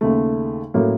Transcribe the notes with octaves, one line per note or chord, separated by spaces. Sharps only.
D#2 C#3 A3
A2 F#3 A#3 C#4